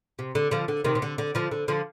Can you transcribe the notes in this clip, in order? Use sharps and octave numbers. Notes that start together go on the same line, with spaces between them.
C3
D3
D3 F3
D3
C3 D#3
C3
D3
D3
D3 F3
D3
D3 F3